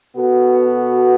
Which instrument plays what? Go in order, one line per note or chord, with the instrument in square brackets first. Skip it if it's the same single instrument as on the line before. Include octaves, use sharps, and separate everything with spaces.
[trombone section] B2 B3 F#4 A4